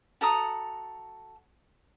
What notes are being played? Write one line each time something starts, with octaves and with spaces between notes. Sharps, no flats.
F#4 A4 A#5 D#6